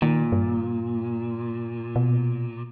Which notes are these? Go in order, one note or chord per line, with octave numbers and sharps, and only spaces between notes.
A#2 D#3
G2
B2